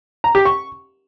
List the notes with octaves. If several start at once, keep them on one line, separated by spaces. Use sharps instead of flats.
A#5
G4
C#6